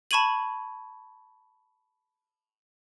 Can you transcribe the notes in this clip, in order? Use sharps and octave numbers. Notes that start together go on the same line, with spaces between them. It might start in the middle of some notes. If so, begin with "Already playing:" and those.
A5 B5 C#6 G#6 D#7 F#7